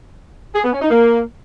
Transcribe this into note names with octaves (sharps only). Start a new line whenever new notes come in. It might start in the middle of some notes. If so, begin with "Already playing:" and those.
G#4
B3
C#4
D#4
A#3